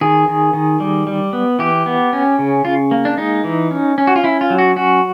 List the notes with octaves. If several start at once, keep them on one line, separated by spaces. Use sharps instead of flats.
D#3 G#4
D#3
D#3
G3
G3
B3
E3 G4
B3
C#4
C#3
C#3 F4
A#3
D4
G#3 D#4
E3
C#4
C#4
F#4
F4
C#4 E4
F4
F#3
F#4
C#4 F#4